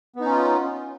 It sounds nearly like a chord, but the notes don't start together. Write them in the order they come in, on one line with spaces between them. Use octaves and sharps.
B3 D#4 C#4 F4